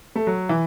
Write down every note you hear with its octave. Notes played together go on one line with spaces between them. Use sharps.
A3
F#3
E3